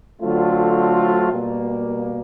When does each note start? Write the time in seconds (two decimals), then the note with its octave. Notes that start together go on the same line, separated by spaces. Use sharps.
0.21 D3 F#3 A3 C4 F4
1.31 B2 G3 A#3